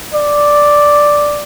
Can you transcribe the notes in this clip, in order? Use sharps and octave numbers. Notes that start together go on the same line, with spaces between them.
D5